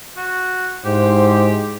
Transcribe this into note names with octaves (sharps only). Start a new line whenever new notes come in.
F#4
G#2 E4 G4 C5